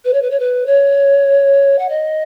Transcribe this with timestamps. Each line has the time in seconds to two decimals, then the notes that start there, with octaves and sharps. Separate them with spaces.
0.05 B4
0.13 C#5
0.22 B4
0.30 C#5
0.39 B4
0.66 C#5
1.78 F#5
1.89 D#5